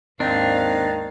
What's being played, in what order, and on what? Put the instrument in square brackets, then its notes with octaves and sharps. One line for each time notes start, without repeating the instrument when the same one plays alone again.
[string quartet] D#2 G#2 F5 [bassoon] D#3 [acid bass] C4 [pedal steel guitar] D4